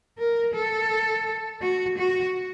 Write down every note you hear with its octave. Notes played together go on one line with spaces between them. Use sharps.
A#4
A4
F#4
F#4